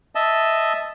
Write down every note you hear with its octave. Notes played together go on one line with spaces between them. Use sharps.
D#5 E5 A5